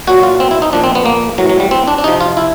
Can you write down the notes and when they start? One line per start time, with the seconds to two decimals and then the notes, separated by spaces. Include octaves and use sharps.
0.07 A#2 F#3 F#4
0.23 F4
0.40 C4
0.51 E4
0.62 D#4
0.73 A#2 F3 D4
0.84 C4
0.95 B3
1.05 A#3
1.38 A2 E3 F#3
1.49 F#3
1.60 G3
1.71 C4
1.88 D4
1.98 D4
2.04 C3 F3 D#4
2.21 F4
2.37 E4